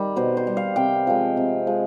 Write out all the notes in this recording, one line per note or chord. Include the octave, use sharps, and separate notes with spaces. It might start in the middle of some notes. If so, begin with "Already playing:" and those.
Already playing: D#3 G3
B2 C5
C5
G3
F5
C3 G5
F3 G#3
C3
F3 G#3